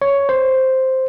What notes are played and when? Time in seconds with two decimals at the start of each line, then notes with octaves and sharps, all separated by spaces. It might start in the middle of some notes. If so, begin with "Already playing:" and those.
0.02 C#5
0.29 C5